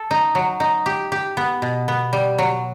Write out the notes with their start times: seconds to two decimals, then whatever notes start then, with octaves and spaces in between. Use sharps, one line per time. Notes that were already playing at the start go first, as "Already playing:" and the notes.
Already playing: A4
0.11 D#4
0.35 F#3
0.60 D#4
0.86 G4
1.12 G4
1.37 B3
1.62 B2
1.88 B3
2.13 G3
2.38 F#3